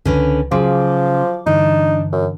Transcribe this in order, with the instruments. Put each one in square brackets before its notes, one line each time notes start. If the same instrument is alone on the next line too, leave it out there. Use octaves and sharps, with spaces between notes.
[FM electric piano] C#2 [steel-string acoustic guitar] D3 C#4 B4
[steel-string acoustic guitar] C#3 [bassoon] F3 [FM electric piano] F#3 C6 D6
[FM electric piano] G2 D3 E3 [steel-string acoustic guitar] D4 [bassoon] D#4
[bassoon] F#2